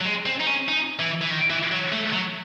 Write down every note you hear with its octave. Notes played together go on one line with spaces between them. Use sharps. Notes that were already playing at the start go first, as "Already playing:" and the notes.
F#3
G#3
C4
D#4
C#4
D#4
E3
E3
D#3
E3
F#3
A3
F#3